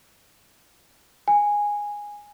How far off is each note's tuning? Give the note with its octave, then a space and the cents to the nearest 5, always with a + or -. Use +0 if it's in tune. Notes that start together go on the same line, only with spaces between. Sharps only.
G#5 -10